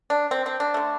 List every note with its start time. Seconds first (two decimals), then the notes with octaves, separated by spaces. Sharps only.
0.10 D4
0.31 C4
0.46 C4
0.60 D4
0.74 D3 A3